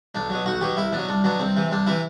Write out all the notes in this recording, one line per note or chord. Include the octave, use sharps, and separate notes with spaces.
B1 D4
B2 F#3
B1 F#4
B2 F#3 G4
C2 E4
B2 F#3 D4
C2 D4
B2 F#3 D4
C2 C4
C3 E3
C2 D4
C3 E3 E4